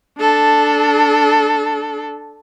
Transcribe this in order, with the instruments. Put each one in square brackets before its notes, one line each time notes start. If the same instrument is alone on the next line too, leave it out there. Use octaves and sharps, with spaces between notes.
[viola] D4 A4